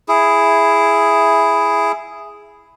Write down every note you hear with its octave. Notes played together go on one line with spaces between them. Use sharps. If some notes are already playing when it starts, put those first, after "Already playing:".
E4 G#4